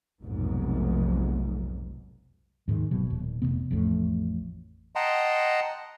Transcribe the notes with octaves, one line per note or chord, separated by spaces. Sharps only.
F1 B1 G#2
D#2 G#2 B2 D#3
F#1 B2 F#3
D#1
F1 D#2 C3 B3
A1 F2 A2
D#5 F#5 G5 A5 A#5 C6